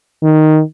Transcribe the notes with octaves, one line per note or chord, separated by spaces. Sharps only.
D#3